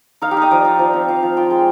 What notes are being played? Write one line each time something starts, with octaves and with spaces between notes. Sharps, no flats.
D#4 F5
G4
D#4 D#5
F3 D5
D#4
F3
C4
F3 F5
F3
F4 G5
G#3